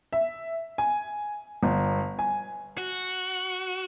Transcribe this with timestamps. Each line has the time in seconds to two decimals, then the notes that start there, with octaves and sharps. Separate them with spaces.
0.13 E5
0.78 G#5
1.63 G1
2.19 G#5
2.78 F#4